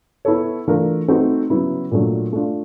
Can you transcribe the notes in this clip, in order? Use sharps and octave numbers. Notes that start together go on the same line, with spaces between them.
B3 E4 A4 C#5
E3 A3 D4 F4 A#4
A3 C4 D#4 F#4 B4
C#3 F#3 B3 E4
A#2 F#3 A3 D4
A3 D4 F4